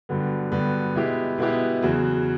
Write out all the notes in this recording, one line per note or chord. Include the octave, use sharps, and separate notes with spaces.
G2 D3 F#3 B3
G2 D3 F#3 B3
B2 G#3 B3 E4 G4
B2 G#3 B3 E4 G4
E2 C#3 F#3